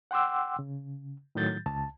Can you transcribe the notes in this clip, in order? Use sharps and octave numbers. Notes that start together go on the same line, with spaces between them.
F#5 G5 C6 D6 E6
C#3
A2 D#3 F#3 G6 A6
C#2 A5